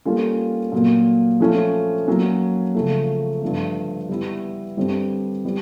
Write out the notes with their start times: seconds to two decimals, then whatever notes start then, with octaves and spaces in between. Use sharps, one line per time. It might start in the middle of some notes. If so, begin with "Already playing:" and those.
0.05 G3 A#3 C#4 F4 A4
0.72 A#2 F#3 A#3
1.40 F3 A3 C#4
2.08 F#3 A#3 C#4
2.75 C#3 F3 A3
3.42 G2 D3 F3 A3
4.09 G3 B3 E4
4.77 G2 D3 G3 C4
5.45 G3 B3